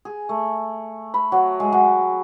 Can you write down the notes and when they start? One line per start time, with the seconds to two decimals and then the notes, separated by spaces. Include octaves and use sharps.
0.05 G#4
0.29 A3
1.14 B5
1.32 F#3
1.60 G#3
1.72 F#3